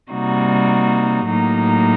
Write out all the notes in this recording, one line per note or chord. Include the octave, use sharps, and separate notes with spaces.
C3 G3 A#3 D#4 F#4
A2 F#3 A#3 D#4